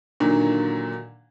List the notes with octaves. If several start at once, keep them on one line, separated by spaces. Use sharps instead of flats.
A#2 D3 D#3 F#3